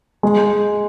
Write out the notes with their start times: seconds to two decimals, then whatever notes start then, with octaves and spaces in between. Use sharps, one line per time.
0.23 G#3